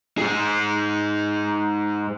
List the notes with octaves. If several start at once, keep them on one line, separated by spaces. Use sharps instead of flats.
G#2 G#4